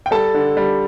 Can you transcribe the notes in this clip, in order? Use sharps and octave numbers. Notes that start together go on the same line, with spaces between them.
G5
G3 A4 A5
D3
G3